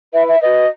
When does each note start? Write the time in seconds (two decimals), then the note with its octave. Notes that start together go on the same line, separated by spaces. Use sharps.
0.12 E4 B4 E5
0.27 E5
0.41 F#4 B4 D#5